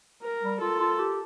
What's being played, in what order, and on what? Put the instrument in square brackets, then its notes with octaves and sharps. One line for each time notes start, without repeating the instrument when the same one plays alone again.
[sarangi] A#4
[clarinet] G3
[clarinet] F4 [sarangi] A4
[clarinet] F4
G4